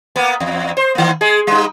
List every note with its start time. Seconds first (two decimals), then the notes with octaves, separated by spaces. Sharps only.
0.16 A#3 B3
0.40 E2
0.77 C5
0.95 D#3 A#3
1.21 G#3 G#4
1.47 G3 D#4